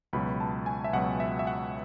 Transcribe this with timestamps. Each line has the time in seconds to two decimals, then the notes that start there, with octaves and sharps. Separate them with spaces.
0.13 C#2 B2 F#3 B5
0.40 A5
0.66 G#5
0.84 E5
0.93 C#2 B2 F#3 F#5
1.20 E5
1.39 E5
1.47 F#5